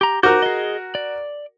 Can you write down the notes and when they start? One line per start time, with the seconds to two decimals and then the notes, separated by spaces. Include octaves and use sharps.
0.01 G4 A#5
0.23 F#4 A#4 C5 D6 G6
0.42 G#4 D#5
0.95 D5